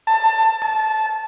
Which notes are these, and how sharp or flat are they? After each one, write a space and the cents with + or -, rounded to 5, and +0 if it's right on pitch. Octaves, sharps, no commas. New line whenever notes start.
A5 +20
A5 -20